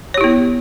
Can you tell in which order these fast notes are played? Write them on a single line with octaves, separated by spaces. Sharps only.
C#5 G4 E4 B3